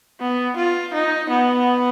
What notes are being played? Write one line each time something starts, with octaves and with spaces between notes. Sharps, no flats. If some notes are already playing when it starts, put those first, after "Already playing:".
B3
F4
D#4
B3